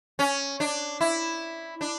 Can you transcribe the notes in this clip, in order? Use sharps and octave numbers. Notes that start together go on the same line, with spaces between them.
C#4
D4
E4
D4